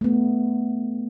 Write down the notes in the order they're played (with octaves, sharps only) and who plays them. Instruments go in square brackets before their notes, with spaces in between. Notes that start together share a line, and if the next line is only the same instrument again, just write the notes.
[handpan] A3 B3